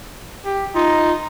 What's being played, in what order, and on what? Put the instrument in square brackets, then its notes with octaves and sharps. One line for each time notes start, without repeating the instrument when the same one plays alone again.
[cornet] G4
[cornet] D#4 [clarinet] F4